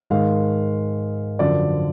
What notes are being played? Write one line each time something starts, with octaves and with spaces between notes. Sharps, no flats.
G#2 D#3 G#3 F5
F#2 D3 F3 D5